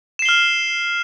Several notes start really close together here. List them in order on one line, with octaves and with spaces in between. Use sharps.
E7 C7 G7 F6